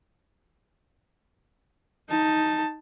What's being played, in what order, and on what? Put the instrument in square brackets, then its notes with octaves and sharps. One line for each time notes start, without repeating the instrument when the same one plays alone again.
[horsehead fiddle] D#4 A5